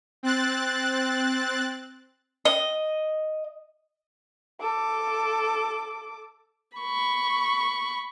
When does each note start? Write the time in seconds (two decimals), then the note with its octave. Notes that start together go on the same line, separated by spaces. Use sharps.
0.23 C4 F#6 A6
2.45 D#5
4.61 A4 D6
6.77 B5 C#6